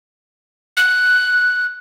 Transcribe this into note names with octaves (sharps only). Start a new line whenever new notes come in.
F#6